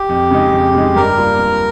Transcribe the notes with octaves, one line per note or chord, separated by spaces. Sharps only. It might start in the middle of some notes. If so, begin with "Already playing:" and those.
Already playing: G4
F2
C#3 G#3 D#4
F2
C#3 G#3 D#4
G2 A#4
G3 A#3 F4
G2